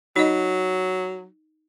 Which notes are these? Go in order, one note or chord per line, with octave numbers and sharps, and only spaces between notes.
F#3 D#4 D#5